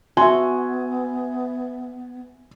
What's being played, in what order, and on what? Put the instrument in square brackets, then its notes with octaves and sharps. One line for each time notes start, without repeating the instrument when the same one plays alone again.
[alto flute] B3 [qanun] F#4 [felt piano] E5 G#5 [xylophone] C6